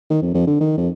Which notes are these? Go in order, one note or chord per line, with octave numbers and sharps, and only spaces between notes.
D#3
F2
F2
D3
D#3
F2